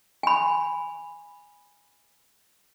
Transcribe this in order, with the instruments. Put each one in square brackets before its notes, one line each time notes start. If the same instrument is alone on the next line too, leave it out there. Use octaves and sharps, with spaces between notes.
[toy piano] G#5 B5